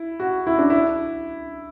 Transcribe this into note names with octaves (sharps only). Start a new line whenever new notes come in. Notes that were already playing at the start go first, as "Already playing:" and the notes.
Already playing: E4
F#4
E4
D4
E4